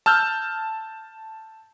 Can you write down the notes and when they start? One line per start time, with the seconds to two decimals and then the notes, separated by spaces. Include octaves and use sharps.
0.06 A5 E6 F6 G6